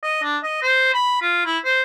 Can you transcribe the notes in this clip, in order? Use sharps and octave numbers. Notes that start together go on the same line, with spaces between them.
D#5
D4
D#5
C5
B5
F4
E4
C5